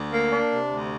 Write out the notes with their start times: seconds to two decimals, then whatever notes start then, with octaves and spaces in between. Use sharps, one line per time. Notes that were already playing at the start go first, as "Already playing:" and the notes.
Already playing: D2
0.12 A#3
0.32 D4
0.51 C3
0.72 D2